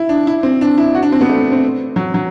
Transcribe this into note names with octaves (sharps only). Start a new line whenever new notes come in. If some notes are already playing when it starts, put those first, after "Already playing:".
Already playing: E4
D4
E4
C4
D4
E4
F#4
D4
C4
B3
A3
C4
F#3
F#3